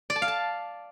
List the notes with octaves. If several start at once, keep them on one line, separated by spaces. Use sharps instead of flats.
D5
A5
F5
A5